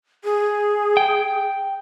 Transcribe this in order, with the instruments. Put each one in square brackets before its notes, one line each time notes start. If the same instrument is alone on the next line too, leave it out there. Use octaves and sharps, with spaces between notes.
[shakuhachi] G#4
[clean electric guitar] G5